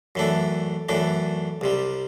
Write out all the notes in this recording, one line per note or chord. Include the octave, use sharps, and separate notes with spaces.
F#2 E3 A3 D4
F#2 E3 A3 D4
C2 C3 G3